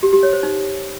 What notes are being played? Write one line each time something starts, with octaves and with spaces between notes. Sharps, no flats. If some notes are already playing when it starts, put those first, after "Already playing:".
G4
G4
C#5
C5
D#4